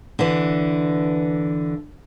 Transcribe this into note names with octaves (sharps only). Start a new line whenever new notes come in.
D3 E3